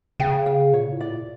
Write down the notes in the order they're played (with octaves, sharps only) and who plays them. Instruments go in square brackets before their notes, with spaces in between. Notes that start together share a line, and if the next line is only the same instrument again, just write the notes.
[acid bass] C#3 [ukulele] G5
[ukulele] F5
[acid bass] A#2 [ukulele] C#5
[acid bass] A2
[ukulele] D5
[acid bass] A#2